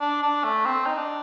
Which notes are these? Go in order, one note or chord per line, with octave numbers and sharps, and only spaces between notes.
D4
D4
A3
C4
D#4
D4